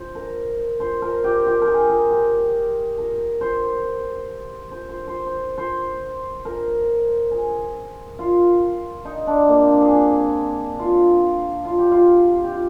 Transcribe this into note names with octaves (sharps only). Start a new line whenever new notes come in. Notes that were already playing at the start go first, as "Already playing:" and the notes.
Already playing: C5
A#4
C5
A#4
G4
G4
A#4
G#4
A#4
G4
A#4
C5
C5
C5
C5
C5
C5
A#4
G#4
F4
D#4
D4
A#3
C4
D4
G#4
G#4
F4
F4
G4
F4
G4
F4